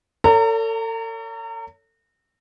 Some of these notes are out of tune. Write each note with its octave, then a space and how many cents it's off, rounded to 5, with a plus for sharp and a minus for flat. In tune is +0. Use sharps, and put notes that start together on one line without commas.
A4 +40 C#5 +30 A#5 -30